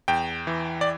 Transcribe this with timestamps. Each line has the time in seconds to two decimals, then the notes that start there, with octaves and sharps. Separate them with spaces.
0.08 E2 G5
0.47 E3
0.81 D5